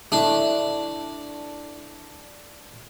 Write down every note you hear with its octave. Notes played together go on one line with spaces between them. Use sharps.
A3 D4 E4